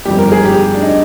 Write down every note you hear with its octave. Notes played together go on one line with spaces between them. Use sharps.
G1 F2 D#3 G3 G4
A#4
G#4
G4
D4
D#4